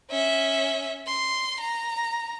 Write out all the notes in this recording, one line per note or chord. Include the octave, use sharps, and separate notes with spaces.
C#4 E5
C6
A#5